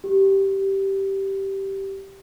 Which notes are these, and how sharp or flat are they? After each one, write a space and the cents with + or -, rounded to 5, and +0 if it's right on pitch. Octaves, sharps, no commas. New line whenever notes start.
G4 -10